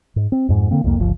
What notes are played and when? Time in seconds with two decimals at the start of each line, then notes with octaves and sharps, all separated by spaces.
0.16 G#2
0.32 C4
0.49 F2 G#2
0.71 D3 A#3 C4
0.84 C2 F2 F3 A#3
1.00 G1 C#2 F3